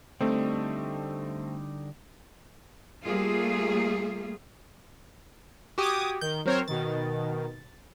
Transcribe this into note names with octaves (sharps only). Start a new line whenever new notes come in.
D3 G3 A3 C4 D#4
G3 A3 A#3 F4 G#4
F#4 G4 D6 D#6 G#6
D#3 G6
F#3 C4 A#4 C5 C#5
B2 D#3 A6